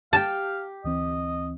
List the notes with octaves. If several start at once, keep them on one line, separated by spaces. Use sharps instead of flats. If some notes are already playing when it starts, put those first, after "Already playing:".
G4 F5 G5 A5
D2 E3 C4 D#5